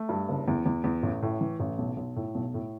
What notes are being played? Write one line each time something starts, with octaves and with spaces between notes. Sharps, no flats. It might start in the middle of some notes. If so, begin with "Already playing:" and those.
Already playing: A3
G2
F#1
E2
E2
E2
A1
A2
E3
A1
B1
B1
A2
B1
A2